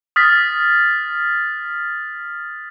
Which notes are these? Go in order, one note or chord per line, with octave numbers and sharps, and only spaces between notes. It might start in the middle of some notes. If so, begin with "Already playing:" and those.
D#6 F6 A6 B6